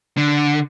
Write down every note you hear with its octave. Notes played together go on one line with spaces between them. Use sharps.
D3